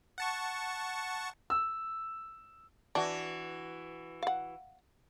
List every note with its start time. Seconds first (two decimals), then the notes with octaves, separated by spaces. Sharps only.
0.18 F#5 A5 C#6
1.50 E6
2.95 E3 D4 F#4
4.23 F5 F#5